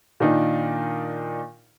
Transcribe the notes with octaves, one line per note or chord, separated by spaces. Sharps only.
A#2 D#3 D4 D#4 F4